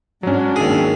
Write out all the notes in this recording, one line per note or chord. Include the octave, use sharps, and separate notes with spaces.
G#2 F#3 C#4 D4
D#2 G#4